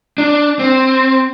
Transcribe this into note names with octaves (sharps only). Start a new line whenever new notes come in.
D4
C4